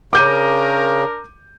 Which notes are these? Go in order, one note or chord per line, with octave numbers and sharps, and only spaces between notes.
C#3 D4 A#4 D6 G6 D#7